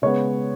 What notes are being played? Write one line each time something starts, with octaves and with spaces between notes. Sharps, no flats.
C#3 G#3 B3 C#5